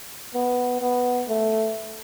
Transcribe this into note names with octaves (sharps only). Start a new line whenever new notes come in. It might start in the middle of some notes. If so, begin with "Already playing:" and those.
B3
B3
A3